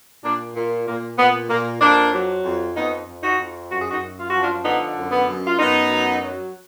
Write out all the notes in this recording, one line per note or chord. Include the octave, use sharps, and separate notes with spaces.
A#2 A#3 D4
A#2
A#2 A#3
A#2 B3
A#2 A#3
F2 A#3 D4
F#3
F2
F2 B3 D#4
F2
D#4 F#4
F2
F#2 F#4
G#4
D#4 F#4
F#2
F4
F3 F#4
D4 F4
D3 B3 D#4
F#2
B3
F#2
F4
F#2 B3 D#4
F#3
F#3